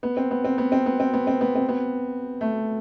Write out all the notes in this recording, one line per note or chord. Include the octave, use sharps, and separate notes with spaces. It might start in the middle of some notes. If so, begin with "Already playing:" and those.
B3
C4
B3
C4
B3
C4
B3
C4
B3
C4
B3
C4
B3
A3